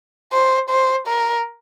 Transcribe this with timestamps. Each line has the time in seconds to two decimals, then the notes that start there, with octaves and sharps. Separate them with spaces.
0.32 C5
0.69 C5
1.07 A#4